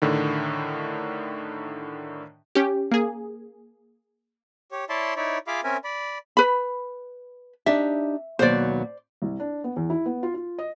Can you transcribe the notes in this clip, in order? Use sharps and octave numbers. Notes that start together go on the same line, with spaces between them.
A2 D3 D#3
C#4 G4
A#3 G#4
G4 C#5
E4 C#5 D5 E5 A5 C6
D#4 E4 C#5 D5 E5
F4 G#4 E5 F5 B5 D6
C4 C#4 A#4 E5 G#5
D5 B5
B4 B5
D4 D#4 G4 E5
D#2 B2 F#3 C5 D5
C2
D4
B3
E2
E4
B3
F4
F4
D#5